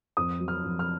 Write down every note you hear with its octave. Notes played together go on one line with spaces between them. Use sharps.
F2 D#6
F#3
F6
F2
F6